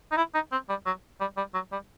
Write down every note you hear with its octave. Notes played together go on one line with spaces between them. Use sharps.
D#4
E4
D#4
C4
G3
F#3
G3
G3
F#3
G3